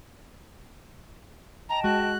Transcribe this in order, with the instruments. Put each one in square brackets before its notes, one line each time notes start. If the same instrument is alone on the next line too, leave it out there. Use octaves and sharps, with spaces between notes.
[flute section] D#5 G5 A5 [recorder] A#5
[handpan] G#3 [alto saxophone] F#4 [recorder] F#6